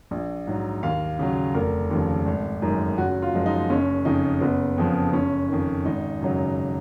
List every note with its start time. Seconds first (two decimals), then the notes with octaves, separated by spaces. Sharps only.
0.11 A#1
0.47 G#2 F#3
0.83 D#2 F5
1.19 C#3 F#3
1.54 F1 A#4
1.91 D#2 C#3 F3
2.26 G#1
2.62 F#2 D#3 G#3
2.98 F#1 F#4
3.22 F4
3.34 F#2 F3 G#3
3.46 D#4
3.70 F#1 C#4
4.05 F2 C#3 D#4
4.41 F#1 B3
4.78 F2 C#3 F3
5.13 F#1 C#4
5.49 F2 D#3
5.85 G#1 D#4
6.21 F#2 C#3 F#3